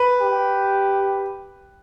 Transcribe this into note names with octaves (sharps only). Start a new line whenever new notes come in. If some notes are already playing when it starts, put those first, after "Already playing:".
Already playing: B4
G4